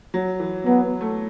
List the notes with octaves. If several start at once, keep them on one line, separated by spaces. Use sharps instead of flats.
F#3
E3
F#3 B3
A3